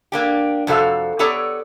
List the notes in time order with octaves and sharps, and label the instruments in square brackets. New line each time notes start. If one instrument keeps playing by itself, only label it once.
[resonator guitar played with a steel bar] A#3 D4 G4
F2 C3 F#4 A4 F5
B3 G4 A4 C#5 D5 A#5